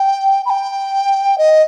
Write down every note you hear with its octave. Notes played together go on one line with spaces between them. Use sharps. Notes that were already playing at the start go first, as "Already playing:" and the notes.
Already playing: G5
B5
G5
D#5